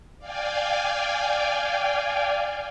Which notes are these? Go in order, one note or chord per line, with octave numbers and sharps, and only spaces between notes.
D5 F5 G5 G#5